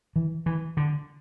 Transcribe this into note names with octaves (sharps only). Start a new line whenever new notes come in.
E3
E3
D3